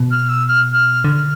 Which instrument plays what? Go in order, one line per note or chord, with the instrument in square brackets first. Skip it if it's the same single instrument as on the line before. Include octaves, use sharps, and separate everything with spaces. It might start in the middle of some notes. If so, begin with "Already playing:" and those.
Already playing: [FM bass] B2
[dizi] F6
E6
F6
F6
[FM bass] D3